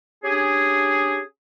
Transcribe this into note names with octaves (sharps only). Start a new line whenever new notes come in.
C#4 D4 G4 G#4